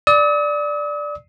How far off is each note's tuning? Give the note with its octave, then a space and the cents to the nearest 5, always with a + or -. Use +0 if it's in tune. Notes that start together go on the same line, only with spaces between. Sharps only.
D5 +0 D#6 +45